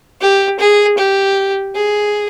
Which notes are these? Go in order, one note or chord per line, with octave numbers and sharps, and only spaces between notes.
G4
G#4
G4
G#4